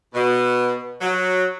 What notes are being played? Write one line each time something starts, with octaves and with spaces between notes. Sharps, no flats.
B2
F#3